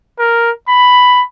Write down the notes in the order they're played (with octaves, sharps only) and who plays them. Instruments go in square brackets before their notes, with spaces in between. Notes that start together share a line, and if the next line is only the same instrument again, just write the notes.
[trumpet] A#4
B5